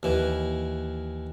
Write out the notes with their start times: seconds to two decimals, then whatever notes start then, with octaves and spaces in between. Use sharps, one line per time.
0.03 D#2 E3